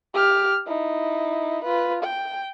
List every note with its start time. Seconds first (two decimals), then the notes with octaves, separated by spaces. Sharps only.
0.14 G4 F6
0.67 D#4 E4
1.64 F4 B4
2.03 G5